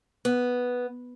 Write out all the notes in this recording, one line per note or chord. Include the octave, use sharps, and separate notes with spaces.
B3